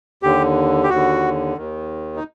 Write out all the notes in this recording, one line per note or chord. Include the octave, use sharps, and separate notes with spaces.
D#2 D3 G4
G4
D#2 D3 F#4
D#2 D#3
D#4